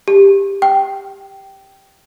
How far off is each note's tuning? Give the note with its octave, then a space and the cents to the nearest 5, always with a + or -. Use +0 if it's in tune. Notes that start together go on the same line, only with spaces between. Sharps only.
G4 +15
G5 -10